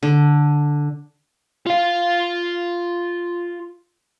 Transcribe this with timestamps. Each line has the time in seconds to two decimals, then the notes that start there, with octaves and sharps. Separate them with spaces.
0.03 D3
1.66 F4 F5